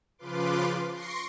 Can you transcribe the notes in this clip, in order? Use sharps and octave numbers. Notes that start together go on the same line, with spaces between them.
C#3 F3 F4 B4 C6 D6
C6 C#6 A#6 C7 D7